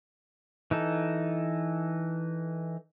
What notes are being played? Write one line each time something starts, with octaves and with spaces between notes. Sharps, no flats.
E3 D#4 A4